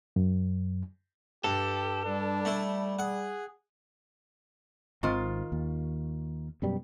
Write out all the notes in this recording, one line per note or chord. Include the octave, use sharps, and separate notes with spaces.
F#2
G2 G4 A4
G3 D4
A3 E4
G#4 F#5
G#1 D#3 C4 F4
D#2
F#2 B2 G3